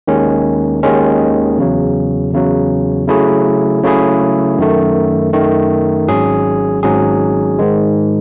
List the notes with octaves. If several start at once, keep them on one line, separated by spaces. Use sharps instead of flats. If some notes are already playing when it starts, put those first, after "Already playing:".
D#2 D#3 G#3 C#4
D#2 D#3 G#3 C#4
E2 C#3 F#3
E2 C#3 F#3
C#3 F#3 A3 E4 G#4
C#3 F#3 A3 E4 G#4
F#2 D#3 A3
F#2 D#3 A3
G#1 G#2 F#3 C#4 G#4
G#1 G#2 F#3 C#4 G#4
G#2 D#3 G#3